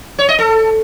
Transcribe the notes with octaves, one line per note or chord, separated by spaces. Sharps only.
C#5
D#5
A4